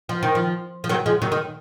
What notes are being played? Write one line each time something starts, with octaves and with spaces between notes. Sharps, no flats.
F3
D#3
F3
F3
D#3 F#3
F3 G#3
D#3 F#3
D#3